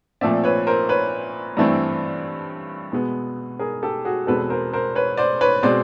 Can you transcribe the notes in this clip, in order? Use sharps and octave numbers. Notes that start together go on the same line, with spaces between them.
A#2 F3 A3 C4 D5 E5
B4 C#5
A#4 C5
B4 C#5
G2 E3 A3 C4
B2 G#3 B3
G#4 A#4
G4 A4
F#4 G#4
E2 B2 G#3 C4 A4 B4
A#4 C5
A#4 C5
B4 C#5
C5 D5
B4 C#5
B2 G#3 C4 C5 D5